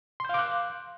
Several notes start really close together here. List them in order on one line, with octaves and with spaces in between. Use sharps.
C6 G6 F5 D6 F#6